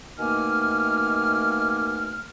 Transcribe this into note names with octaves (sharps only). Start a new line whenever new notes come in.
B2 D#3 A3 A#3 G#5 F6